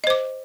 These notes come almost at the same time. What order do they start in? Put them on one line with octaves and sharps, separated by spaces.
D#5 C5 D6